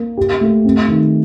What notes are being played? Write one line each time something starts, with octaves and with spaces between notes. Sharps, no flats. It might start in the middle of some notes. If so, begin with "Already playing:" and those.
Already playing: A#3
G4
A3
C4
D#3